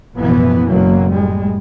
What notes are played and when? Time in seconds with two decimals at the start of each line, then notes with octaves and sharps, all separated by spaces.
0.16 A1 F#2 B2 E3 F3 B3
0.69 F#1 B2 F#3 A#3
1.12 A2 G3 G#3